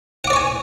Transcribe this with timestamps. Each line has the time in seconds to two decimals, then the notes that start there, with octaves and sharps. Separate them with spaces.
0.24 F#5
0.27 D6
0.30 D5
0.33 C#6
0.36 G#5